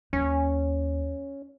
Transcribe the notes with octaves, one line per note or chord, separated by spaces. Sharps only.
D#2 C#4